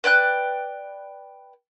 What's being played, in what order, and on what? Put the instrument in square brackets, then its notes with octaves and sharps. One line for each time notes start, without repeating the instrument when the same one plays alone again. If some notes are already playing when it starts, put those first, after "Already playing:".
[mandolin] B4 D5 G5 F#6